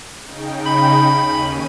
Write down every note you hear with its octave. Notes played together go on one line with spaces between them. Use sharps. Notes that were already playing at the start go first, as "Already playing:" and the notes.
C#3 D#4 G5
B5
D#2 C#4 D#7